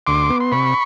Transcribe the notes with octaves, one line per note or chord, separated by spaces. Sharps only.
D2 C6 D6
B3
C6
C3 B5 C#6